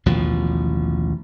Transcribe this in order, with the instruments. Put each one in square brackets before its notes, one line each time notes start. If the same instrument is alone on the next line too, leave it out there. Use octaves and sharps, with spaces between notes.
[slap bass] A1 D#2 B2 F3